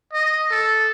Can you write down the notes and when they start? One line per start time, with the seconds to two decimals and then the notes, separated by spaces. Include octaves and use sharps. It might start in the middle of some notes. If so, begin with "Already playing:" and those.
0.13 D#5
0.51 A4